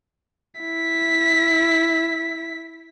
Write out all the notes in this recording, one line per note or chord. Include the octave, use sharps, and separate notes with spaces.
E4 B6